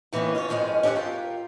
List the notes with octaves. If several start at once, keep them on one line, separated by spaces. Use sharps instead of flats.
D#3 E3 A#3 B3 C#4
C#4 F4 B4 C#5
F2 G#2 D#3 G#3 C#4
C#4 G4 A4 D#5 F#5
F4 A#4 G5